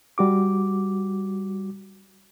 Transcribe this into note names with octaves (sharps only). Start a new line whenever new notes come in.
G3 F#4 D6